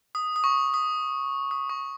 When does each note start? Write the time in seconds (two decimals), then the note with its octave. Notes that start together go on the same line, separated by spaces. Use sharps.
0.15 D#6
0.36 D#6
0.44 C#6
0.74 D#6
1.51 D#6
1.69 C#6